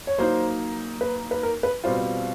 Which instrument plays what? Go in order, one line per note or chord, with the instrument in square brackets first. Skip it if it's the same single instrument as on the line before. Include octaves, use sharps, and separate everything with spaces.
[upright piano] C#5
[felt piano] F#3 A#3 D#4 [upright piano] C5
[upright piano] B4
B4
A#4
B4
[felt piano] B2 G3 C4 F4 [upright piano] C5